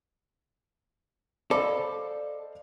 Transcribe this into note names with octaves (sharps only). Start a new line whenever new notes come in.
A4 C5 D5 D#5 F5 B5 D6